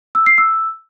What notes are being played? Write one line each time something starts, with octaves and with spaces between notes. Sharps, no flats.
E6
C7
E6